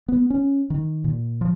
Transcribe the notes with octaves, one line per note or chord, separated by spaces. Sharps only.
B3
C#4
D#3
A#2
F3